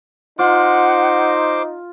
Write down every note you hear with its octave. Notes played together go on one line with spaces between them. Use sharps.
D#4 F4 C5 F#5 D6